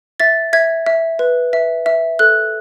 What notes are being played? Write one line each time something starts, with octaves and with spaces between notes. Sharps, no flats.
E5 A6
E5 G#6
E5
B4
E5
E5
A4 F#6